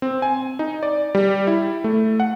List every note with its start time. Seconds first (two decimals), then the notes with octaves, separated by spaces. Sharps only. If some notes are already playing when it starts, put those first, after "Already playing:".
0.02 C4
0.22 G#5
0.59 D#4
0.83 D5
1.15 G3
1.47 E4
1.84 A3
2.20 F#5